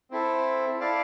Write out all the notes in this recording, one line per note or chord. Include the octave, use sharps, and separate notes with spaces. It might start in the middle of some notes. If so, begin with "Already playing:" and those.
C4 E4 A4
E4 A4 D5 F5